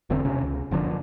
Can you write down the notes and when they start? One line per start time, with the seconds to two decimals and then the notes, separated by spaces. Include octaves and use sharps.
0.10 E1 E2 D3 C4
0.25 E1 B1 C3 C#4
0.43 C#2
0.71 F#1 D3 F3 D4